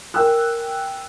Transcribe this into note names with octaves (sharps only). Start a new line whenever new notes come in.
A#4 G5 G#5 E6 F#6